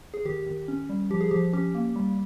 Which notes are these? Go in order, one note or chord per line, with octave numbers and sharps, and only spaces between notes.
G#4
D#3 G4
D#3
C#4
G3
F3 G4
G#4
F3 G4
C#4 G4
A#3
G3